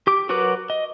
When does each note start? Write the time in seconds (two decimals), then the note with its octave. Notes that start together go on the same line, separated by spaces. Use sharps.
0.07 G4 D6
0.29 F#3 F#4 A#4 B4 D6
0.70 D#5